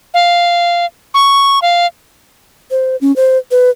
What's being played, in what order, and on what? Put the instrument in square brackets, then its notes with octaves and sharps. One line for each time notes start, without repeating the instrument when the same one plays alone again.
[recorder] F5
C#6
F5
[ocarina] C5
C#4
C5
B4